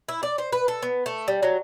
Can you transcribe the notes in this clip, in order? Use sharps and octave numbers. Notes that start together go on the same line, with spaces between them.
E4
D5
C5
B4
A4
B3
A3
G3
F#3